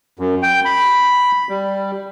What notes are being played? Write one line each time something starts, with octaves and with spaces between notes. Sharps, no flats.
F#2
G5
B5
G3